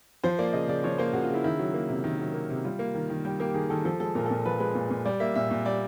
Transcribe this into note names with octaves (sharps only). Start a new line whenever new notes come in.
F3 C5
A#3 D5
C#3 D#5
C#3 D5
F3 C#5
A#3 C5
C#3 F#4
F4
C#3 E4
D#3 E4
F#3
A#3
C3
D#3
F#3
A#3
C3
G3 F4
A#3
D#3
D#3
G3 G4
A#3 G4
D#3 G#4
D#3 A4
F3 A4
G#3 A4
A#2 A#4
A4
A#2
F3 B4
G#3 B4
A#2
A#2
G3 D5
A#3 E5
A#2 E5
A#2
G3 D5